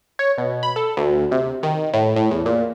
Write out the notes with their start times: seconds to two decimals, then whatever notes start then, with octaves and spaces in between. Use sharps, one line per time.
0.19 C#5
0.38 B2
0.63 B5
0.76 A4
0.97 D2
1.32 C3
1.63 D#3
1.93 A2
2.16 A2
2.31 E2
2.46 A#2